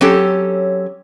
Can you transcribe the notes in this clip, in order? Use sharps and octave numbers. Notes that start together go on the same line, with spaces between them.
F#3 C4 C#4 G4 A4